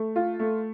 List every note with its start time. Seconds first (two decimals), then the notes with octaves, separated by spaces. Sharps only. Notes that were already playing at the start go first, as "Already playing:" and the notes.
Already playing: A3
0.16 F4
0.39 A3